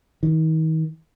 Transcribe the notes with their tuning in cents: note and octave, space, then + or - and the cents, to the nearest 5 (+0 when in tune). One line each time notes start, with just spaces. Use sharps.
D#3 +40